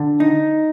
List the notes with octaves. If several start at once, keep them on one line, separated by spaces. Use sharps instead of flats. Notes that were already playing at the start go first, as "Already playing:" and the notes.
Already playing: D3
D#4